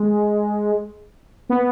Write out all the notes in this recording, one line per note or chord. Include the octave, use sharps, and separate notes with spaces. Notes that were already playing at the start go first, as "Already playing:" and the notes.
Already playing: G#3
B3